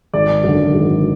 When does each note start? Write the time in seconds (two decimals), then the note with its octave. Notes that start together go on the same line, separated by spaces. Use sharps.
0.14 G#1 D5
0.44 F#2 D3
0.75 G#1